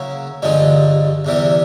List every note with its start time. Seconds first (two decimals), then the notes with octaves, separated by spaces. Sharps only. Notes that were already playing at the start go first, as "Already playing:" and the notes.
Already playing: C#3 F#3 A#3 C#4 E4
0.42 A1 G2 D3 F3 G#3
1.25 E2 C3 E3 G3